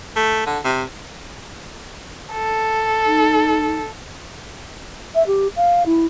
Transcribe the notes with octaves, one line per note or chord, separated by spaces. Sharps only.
A3
D3
C3
A4
D#4
E5
G4
F5
E4